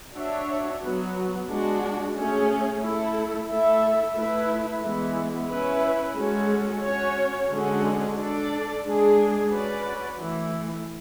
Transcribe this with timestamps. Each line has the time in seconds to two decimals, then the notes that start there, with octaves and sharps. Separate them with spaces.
0.14 D4 F#4 C#5 E5
0.81 F#3 B3 F#4
1.48 G#3 D4 F#4
2.15 A3 C#4 G#4
2.82 A3 E4 A4
3.49 A3 E4 A4 E5
4.15 A3 E4 B4 E5
4.83 E3 G#3 B3 E4
5.49 C#4 E4 B4 E5
6.16 G#3 C#4 F#4 A4
6.83 C#4 F#4 C#5
7.50 D3 G#3 C#4 F#4
8.17 D4 A4 D5
8.84 G#3 D4 G#4
9.51 C#4 F#4 B4 D5
10.18 E3 A3 E4